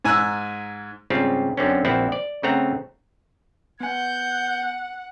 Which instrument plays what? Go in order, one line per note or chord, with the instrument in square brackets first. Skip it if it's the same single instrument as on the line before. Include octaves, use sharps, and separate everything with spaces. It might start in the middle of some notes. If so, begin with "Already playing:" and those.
[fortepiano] G#2 G#5 A#5 E6 F#6
[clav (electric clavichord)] G#2 C#3 G3 C4 F4 G4
F#2 D3 C4 C#4
A#1 F3 C4 E4 F#5
D5
C#3 A3 C4 F#5 A#5
[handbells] B3 G#5 [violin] F#5 [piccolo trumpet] G6